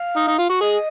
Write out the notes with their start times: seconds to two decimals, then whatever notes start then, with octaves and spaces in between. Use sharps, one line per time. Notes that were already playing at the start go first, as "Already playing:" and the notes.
Already playing: F5
0.17 D#4
0.28 D#4
0.39 F4
0.50 F#4
0.61 G#4 D#5